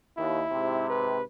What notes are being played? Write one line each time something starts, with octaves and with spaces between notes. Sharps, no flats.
D#2 E4
G#2 C3
B4